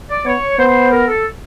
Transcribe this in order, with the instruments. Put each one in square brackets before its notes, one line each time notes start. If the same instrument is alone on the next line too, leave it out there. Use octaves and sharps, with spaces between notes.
[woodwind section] D5
[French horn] B3 [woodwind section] C#5
[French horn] B3 [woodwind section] C5
[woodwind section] A#4
A4